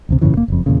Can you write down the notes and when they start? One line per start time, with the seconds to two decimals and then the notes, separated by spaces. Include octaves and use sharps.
0.09 A1 D2 C3
0.21 F#2 A#2 C#3 E3
0.34 F1 A#3
0.48 F#1 F2
0.66 E2 A#2 C#3